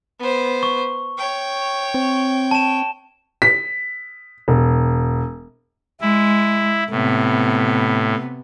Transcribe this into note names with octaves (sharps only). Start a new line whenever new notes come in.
B3 C5
C#6
C#5 G5
C4
A5 E7
B6
E1
G#3 E4
A2 C3 B3